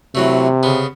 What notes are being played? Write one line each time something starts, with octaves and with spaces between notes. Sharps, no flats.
C3 E3 F#3 A3
C#3 B3